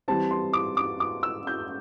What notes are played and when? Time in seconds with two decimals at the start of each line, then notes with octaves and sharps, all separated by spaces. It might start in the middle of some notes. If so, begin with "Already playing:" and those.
0.08 E3 G3 C4 A5
0.31 C6
0.53 D6
0.77 D6
1.00 D6
1.23 E6
1.47 G6